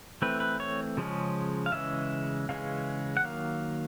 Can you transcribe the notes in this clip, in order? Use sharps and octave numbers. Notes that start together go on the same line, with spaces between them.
E3 A3 C4 B4
B4
C#5
C#3 F3 G#3 C#4
F5
C#3 E3 G#3 C#4 E5
C#3 E3 G#3 C#4 F5
F#5
D#3 F#3 A#3 F5